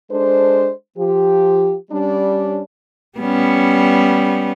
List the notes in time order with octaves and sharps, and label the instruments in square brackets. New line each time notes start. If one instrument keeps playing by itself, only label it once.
[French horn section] G#3 D4 A4 C5
F3 G4
G3 C#4 D4
[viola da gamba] G3 B3 C#4